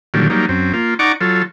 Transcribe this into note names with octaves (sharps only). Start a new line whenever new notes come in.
A#2 D3 D#3 F#3 G3
F#3 G3 A#3 D#4
F#2 C4
A#3 F4
D#4 D5 F#5 A#5 C#6 D6
F#3 F4 A4